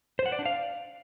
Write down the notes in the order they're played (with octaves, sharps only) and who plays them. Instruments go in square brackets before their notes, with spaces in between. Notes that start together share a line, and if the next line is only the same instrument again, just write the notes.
[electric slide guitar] C5
F#5
D5
D4
F5